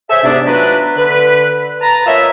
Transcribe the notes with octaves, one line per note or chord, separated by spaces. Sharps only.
G#4 A4 C5 C#5 E5
G#2 C3 B3 D4
F3 F#3 A3 D4 B4
D3 B4
B4 A5 A#5
A#3 F4 C#5 D#5 E5